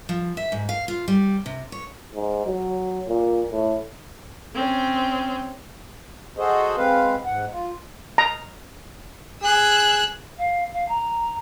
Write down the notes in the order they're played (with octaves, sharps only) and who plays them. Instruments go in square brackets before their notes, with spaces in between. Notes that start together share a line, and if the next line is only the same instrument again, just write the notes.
[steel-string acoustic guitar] F3
E5
G#2
F5
F4
G3
C3
C#5
[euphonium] G#2
F#3
A#2
A2
[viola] C4 C#4
[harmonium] F#4 G#4 A4 C5 D#5
G#3 C4 B4 F5
G#2 F#5
F4
[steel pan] A#5
[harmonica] G#4 [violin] E6 F#6
[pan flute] F5
F5
A#5